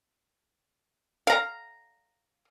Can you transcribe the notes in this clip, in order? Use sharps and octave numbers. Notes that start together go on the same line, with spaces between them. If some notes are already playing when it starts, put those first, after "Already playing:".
F5 A#5